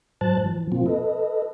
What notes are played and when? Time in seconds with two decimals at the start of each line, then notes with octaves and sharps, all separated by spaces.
0.21 G#2 F#3 C5 A5 F#6 A6
0.45 E3 F3
0.72 B2 F3 A#3 C4 F4
0.86 A4 B4 D#5